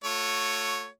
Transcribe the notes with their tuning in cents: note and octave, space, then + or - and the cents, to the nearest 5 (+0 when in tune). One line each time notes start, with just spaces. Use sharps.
A3 +10 F#4 -40 C#5 +0